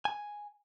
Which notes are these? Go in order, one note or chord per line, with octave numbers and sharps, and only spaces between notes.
G#5